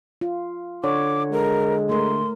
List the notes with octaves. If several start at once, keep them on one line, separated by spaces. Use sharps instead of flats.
F4
D3 C#5 D6
G#3 A#4
A3 A#4 C6